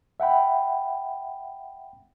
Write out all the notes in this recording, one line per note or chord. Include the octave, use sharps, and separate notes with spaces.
E5 F#5 G5 B5